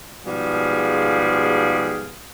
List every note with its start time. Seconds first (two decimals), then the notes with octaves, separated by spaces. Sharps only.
0.25 G#2 B2 F3 G3 G#4 F5